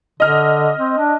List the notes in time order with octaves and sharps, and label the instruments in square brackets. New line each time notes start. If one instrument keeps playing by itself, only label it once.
[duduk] D3 [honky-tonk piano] D#5 F6
[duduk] C4
D4